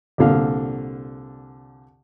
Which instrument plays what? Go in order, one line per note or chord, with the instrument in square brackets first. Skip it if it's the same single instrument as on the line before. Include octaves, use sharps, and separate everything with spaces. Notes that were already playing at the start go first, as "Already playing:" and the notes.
[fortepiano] C2 A#2 D3 F5